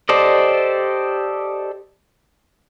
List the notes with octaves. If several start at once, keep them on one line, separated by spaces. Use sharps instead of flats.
G4 A4 C5 D5 D#5